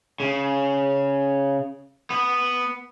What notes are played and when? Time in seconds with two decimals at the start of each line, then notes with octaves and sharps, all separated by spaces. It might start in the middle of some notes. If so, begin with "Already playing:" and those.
0.20 C#3
2.10 B3